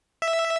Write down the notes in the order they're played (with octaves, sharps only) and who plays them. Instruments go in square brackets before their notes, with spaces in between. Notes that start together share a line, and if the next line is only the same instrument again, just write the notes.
[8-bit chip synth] E5